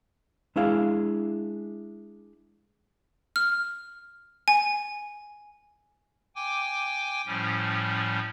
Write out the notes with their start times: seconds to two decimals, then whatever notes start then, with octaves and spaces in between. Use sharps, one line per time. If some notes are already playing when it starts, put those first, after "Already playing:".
0.56 G#3 D4 E4 G#4 F5
3.36 F6
4.48 G#5
6.35 G5 G#5 D6
7.27 A2 F3 G3 C#4